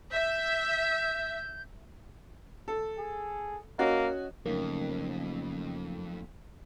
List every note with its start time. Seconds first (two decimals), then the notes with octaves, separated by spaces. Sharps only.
0.12 E5 G6
2.68 A4
2.98 G#4
3.79 A#3 C#4 F#4 D#5
4.46 F2 C#3 F#3 A3 A#3 D#4